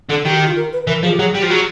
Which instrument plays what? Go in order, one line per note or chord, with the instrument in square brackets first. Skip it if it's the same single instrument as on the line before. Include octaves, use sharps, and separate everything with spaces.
[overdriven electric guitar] D3 [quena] A4
[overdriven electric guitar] D#3 [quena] G4
[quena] G4
F4
A#4
B4
[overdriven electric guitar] E3 [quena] A#4
[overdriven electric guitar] F3 [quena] G#4
[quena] G4
[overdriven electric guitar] F#3 [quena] G#4
[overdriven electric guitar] G3 [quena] G4
[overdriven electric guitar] F3
[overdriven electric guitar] F#3 [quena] G#4